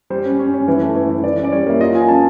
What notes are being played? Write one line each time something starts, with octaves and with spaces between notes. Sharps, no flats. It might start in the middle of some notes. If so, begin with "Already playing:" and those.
G3 C5
C#4
C#4
C#4
E3
A3
E3
E3
E3 D5
C#4
D5
G3 C#5
A#3 E5
F4 D#5
F4 G#5
C#4 A5